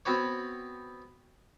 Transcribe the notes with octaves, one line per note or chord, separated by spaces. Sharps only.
B3 C4 F#4 B4 C#5